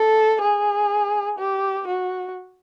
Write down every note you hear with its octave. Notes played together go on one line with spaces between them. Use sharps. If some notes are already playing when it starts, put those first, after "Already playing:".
Already playing: A4
G#4
G4
F#4